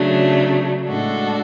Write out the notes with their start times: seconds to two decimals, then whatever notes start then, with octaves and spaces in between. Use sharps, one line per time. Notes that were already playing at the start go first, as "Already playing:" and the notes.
Already playing: C#3 F#3 A3 D4
0.87 A2 G#3 D4 F#4 A4